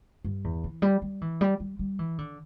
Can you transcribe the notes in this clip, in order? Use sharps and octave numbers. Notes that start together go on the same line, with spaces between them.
G2
E2
E3
G3
G3
E3
G3
G3
G3
E3
D3